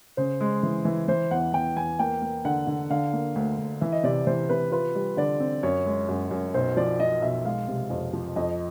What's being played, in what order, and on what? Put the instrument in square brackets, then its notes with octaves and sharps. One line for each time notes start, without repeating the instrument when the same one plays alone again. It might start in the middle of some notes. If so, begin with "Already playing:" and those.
[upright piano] C#3 [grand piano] C5
[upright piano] G#3
E3
E3
[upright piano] E3 [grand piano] C5
[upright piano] E2 [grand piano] F#5
[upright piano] E2 [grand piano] G5
[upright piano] E2 [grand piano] G#5
[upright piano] A#3 [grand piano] G5
[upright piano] A#3
[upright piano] D3 [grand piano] F#5
[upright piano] D3
[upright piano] D3 [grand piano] F5
[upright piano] A#3
D2
D2
[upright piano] E3 [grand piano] E5
[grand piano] D#5
[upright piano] C3 [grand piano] D5
[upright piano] E3 [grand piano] C5
[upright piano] C3 [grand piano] B4
[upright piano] F4 [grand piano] B4
[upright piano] G3
[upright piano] D3 [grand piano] D5
[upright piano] C4
[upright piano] F#2 [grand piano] C#5
[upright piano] G#3
F#2
F#2
[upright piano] B1 [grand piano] C5
[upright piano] F3 [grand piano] D5
[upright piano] F3 [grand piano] D#5
[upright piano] B1 [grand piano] E5
[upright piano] G#3 [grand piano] F5
[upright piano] C3
F2
F3
[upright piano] F2 [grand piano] D#5